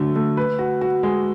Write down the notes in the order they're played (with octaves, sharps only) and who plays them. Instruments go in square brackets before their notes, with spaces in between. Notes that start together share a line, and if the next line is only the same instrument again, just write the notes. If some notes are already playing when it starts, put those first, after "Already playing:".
Already playing: [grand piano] D3 F#3 A3
A3
B4
F#4
F#4
G#3